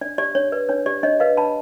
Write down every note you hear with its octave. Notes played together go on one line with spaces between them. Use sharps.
D4 D5
G4 D5
D4 C#5
B4 D5
D4 C#5
G4 D5
D4 C#5 D#5
B4 D#5 F5
D4 A5 B5